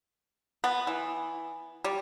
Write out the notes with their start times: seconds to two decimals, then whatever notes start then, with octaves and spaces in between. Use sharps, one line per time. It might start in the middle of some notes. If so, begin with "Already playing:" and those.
0.64 B3
0.87 E3
1.84 G3